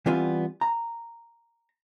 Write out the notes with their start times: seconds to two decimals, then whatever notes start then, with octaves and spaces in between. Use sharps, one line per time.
0.06 E3 G3 B3 C4 F4 G#5
0.61 A#5